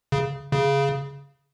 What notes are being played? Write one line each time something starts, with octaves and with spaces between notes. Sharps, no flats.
C#3
C#3